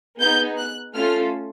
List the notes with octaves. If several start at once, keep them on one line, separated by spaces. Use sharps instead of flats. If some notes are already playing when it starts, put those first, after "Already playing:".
B3 D#4 G#4 G6
F#6
A3 C#4 F4 A4 F6